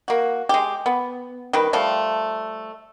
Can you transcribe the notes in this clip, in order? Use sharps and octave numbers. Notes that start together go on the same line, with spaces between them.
A#3 F#4
G#3 G4
B3
D#3 G3 B4
F3 G3 A3